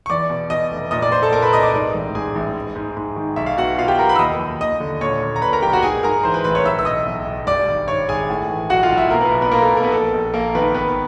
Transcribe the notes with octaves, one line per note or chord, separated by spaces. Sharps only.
C#6
E2 D5 D6
B2
B2 D#5 D#6
F1
A#2 D#5 D#6
D5 D6
A#2 C5 C6
A4 A5
A#2 A#4 A#5
B4 B5
C2 D#5 D#6
D5 D6
G#2
A1
G#2 G#4 G#5
A1
G#2
G#2
G#2
D#3
B1 E5
F5
B2 F#4 F#5
B2 F4 F5
G4 G5
B1 A#4 A#5
B4 B5
E6
D#2 D#5 D#6
D#2
D#2 D#5 D#6
D3
A#2 C#5 C#6
A#2
A#5
A#2 B4 B5
A#4 A#5
B1 G4 G5
F#4 F#5
G#2 G#4 G#5
G#2 A#4 A#5
E3 C5 C6
B4 B5
A1 B4 B5
C#5 C#6
B1 E5 E6
E6
B2 D#5 D#6
B1
B1
G2 D5 D6
G#1
G#1 C#5 C#6
G#1 G#4 G#5
A2
E3
B1 F#4 F#5
F4 F5
B1
E4 E5
B2 A#3 A#4
B3 B4
B1
B3 B4
B2 A#3 A#4
A4
B2 A#4
B3 B4
A#1 A4
A#1
A#1 A#3 A#4
D#3 B3 B4
G#1 B3 B4